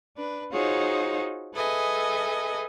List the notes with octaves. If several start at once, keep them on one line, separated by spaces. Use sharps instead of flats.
D4 B4
D#4 F4 F#4 G#4 C5 C#5
G#4 A4 B4 D#5 E5 G#5